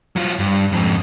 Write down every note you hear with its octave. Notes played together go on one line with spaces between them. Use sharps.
F#3 F4
G2
F2 G#2